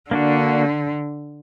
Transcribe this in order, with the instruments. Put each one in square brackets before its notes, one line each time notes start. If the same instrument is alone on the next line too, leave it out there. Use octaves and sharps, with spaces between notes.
[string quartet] D3 [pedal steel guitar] A#3 D4 F#4